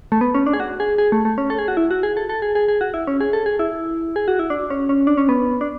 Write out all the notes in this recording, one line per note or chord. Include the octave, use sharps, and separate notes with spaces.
A3
B3
C#4
D4
G#4
F#4
G#4
G#4
A3
A3
C#4
A4
G#4
F#4
E4
F#4
G#4
A4
A4
G#4
G#4
G#4
F#4
E4
C#4
G#4
A4
G#4
E4
G#4
F#4
E4
D4
C#4
C#4
D4
C#4
B3
D4